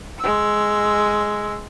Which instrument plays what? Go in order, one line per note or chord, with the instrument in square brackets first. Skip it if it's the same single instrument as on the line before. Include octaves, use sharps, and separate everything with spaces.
[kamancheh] G#3 E6